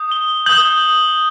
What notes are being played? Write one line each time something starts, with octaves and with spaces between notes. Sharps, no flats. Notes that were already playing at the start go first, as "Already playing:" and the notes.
Already playing: D#6 G6
G7
D#6 G6 F#7